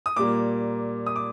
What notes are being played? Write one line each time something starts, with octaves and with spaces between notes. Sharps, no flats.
D#6
A#2 G3 A#3 D6
D#6
D6